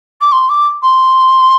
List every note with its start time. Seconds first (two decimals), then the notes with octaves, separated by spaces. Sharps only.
0.21 D6
0.32 C6
0.49 D6
0.82 C6